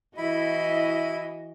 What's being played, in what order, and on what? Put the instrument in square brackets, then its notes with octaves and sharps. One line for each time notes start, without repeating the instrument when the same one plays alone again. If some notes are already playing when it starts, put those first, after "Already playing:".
[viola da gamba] E3 F#4 D#5 [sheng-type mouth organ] E4 B5